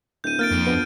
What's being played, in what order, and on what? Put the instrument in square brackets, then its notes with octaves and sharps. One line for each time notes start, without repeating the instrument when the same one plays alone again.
[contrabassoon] D1 [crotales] G6 D#7
[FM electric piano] A#3 [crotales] F6 A6 D7
[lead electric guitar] F2
[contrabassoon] A#1 [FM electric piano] B3